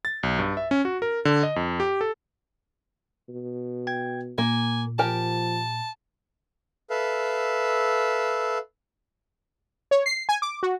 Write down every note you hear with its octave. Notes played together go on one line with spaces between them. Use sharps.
A6
B1
G2
E5
C#4
F#4
A#4
D3
D#5
F2
G4
A4
B2
G5 G#6
A#2 A#3 G#5
F3 G4 A#4 G#5 A5
A4 B4 E5 F5
C#5
C7
G#5
D6
F#4